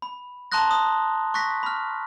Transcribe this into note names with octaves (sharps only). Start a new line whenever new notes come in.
B5
A5 A#5 C6 D#6 F#6 A#6
D#6
C#6 F#6 A#6 B6
B5 F6